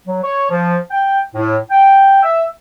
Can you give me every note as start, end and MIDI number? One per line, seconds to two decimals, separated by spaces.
0.07 0.18 54
0.23 0.49 73
0.50 0.77 53
0.91 1.19 79
1.35 1.57 45
1.70 2.22 79
2.23 2.45 76